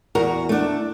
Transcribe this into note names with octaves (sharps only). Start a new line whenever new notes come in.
E2 F#4 A#4
A3 D4